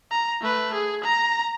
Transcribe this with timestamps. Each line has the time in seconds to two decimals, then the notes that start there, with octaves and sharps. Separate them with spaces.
0.11 A#5
0.41 A3 B4
0.74 G#4
1.04 A#5 A#6